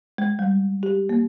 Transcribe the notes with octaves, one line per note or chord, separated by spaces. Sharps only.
G#3
G3
G4
A#3